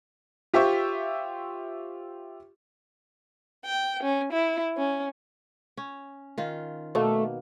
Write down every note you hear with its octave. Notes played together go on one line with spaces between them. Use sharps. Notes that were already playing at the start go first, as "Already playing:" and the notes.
F4 G4 C5 E5 C#6
G5
C#4
E4
C#4
C#4
D#3 F4
B2 A3 A#3